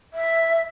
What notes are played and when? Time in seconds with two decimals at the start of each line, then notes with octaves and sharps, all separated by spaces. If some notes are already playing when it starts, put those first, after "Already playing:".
0.14 E5